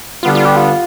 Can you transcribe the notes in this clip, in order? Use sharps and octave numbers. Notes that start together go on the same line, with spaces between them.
D3 G3 B3 F4
F4
G4
F4